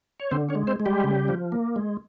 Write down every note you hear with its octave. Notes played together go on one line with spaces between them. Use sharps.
C#5
D3 C4 C5
C#4 C#5
G#3
C4 C5
G#3
G3 G4
C#3
F3
A#3
G#3